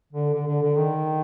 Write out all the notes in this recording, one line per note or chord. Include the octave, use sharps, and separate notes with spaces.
D3
D3
D3
D3
D#3